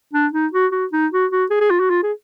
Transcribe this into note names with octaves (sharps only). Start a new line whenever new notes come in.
D4
D#4
F#4
F#4
D#4
F#4
F#4
G#4
G#4
F4
F#4
F4
G#4